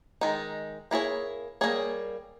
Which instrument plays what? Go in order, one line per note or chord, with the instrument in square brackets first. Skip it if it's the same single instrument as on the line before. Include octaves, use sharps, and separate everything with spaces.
[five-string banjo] D#3 G#3 D#4
A#3 E4 G#4 C#5
G3 A#3 D#4 G#4 C#5